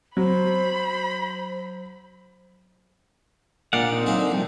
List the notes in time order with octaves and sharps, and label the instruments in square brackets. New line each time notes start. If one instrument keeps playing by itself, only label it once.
[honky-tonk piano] F#3 [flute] C5 [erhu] B5
[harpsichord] A#1 A#3 [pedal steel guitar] D5 F5 F#5
[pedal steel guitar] C4 D#4
[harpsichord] C#3 F#3 A#3
D3
[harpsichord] C2 [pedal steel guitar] F3